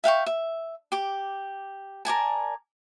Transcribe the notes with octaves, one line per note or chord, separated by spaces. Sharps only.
E5 F5 G5 C#6
E5
G4 D6
A#4 D5 G#5 A5